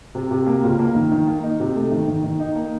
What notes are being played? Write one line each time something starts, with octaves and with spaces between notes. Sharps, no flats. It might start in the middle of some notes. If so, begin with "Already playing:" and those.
C3
C3
A#3
C#2
A#3
D#3
D#3
A#3
D#4
C3
A3
D#3
D#3
D#3
D#4
A#3